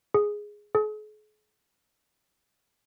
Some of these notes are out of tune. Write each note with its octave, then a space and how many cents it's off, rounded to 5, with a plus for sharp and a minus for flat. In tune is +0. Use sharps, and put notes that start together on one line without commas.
G#4 +0
G#4 +45